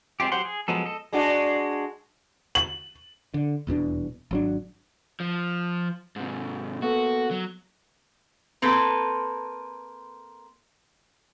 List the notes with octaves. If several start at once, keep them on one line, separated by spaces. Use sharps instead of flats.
G#3 C4 C#4 F4 G4
F#3 G4 C5 F#5 C6
G#4
F3 F#3 G#3 B3 A4
A4 D#5
G#3 D4 F#4
F#7
D3
D#1 E2 B2 D4
G#1 F#3 D4
F3
G#2 C3
A#3 B3 F#4 A4
F#3
A#3 C4 A4 B4